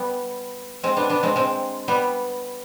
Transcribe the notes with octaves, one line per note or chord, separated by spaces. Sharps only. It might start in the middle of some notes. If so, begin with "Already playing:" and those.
Already playing: G3 B3
G#3 C4
B3 D4
B3 D4
G#3 C4
G#3 C4
G3 B3